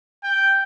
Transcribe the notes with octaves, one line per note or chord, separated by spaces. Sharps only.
G5